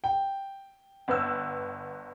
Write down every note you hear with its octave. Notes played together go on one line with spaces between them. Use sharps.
G5
G1 B3 E6